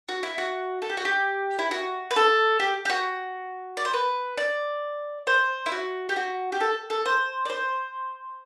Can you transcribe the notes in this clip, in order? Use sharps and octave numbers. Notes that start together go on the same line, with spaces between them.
F#4
E4
F#4
A4
G4
F#4
G4
E4
F#4
B4
A4
G4
G4
F#4
D5
C5
B4
D5
C5
E4
F#4
G4
F#4
G4
A4
A4
C5
D5
C5